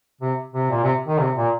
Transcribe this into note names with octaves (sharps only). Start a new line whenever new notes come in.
C3
C3
A#2
C3
D#3
C3
A#2